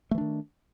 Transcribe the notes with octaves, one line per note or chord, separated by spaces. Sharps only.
D#3 E3 A3 D4